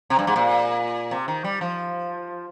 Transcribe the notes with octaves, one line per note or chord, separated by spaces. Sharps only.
C3
G2
G#2
A#2
C3
D#3
G3
F3